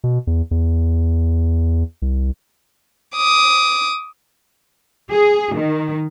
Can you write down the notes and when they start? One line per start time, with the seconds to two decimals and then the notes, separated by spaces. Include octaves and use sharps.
0.04 B2
0.27 E2
0.51 E2
2.02 C2
3.15 D6 D#6
5.10 G#4
5.55 D#3